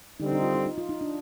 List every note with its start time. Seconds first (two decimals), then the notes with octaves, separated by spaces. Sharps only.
0.20 D3 G3 C4 D#4
0.32 D#4
0.43 F4
0.55 D#4
0.66 D#4
0.78 F4
0.89 D#4
1.01 D4